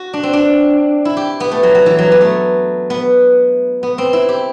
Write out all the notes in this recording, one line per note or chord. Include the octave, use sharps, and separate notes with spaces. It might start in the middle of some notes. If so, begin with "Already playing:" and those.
Already playing: F#4
D4
C4
D4
E4
G4
B3
A3
F#3
F#3
E3
F#3
B3
A3
B3
B3
C4
E4
G4